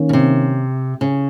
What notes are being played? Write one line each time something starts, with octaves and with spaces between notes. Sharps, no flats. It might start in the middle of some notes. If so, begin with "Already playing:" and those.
Already playing: D#3 A#3 C#4
C#3
C3
C#3